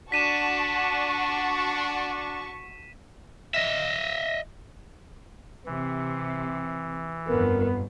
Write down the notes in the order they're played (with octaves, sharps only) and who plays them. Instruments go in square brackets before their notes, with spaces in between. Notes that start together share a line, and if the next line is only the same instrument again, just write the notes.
[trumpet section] D4 [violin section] F#4 A5 C#6 [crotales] B6 D#7 E7
[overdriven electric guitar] D#5 E5
[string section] C3 [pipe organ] E3
[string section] G1 F2 [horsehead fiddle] B3 [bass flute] A#4